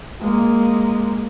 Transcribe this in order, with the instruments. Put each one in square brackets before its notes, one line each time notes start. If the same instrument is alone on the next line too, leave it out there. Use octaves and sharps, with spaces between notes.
[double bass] G#3 A#3